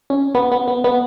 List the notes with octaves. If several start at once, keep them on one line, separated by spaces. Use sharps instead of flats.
C#4
B3
B3
B3
B3